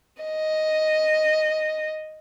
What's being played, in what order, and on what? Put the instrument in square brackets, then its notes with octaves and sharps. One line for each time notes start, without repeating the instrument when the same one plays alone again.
[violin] D#5